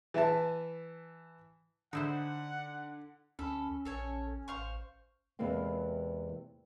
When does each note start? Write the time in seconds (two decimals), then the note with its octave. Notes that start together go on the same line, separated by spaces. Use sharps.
0.14 E3 E5 A5
1.93 D3 D#4 E4 C5 F#5
3.39 D2 C#4 A4 B5
3.85 A#1 A4 C#5 G#5
4.48 A1 C5 F5 C#6
5.39 E2 C3 E3 G#3 A#3 C4